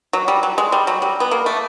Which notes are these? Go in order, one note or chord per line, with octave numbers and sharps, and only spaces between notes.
F#3
G3
F#3
G#3
G3
F#3
G3
B3
A#3
A3